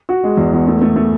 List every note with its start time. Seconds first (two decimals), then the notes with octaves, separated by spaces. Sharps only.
0.09 F#4
0.24 G#3
0.37 E2
0.53 E2
0.67 A3
0.82 A3
0.96 A3